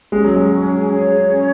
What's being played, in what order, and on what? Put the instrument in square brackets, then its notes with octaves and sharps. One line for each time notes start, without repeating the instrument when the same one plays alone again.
[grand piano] G#3 [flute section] C#4
[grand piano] F#3
G#3
[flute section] G#4
C#5
C#4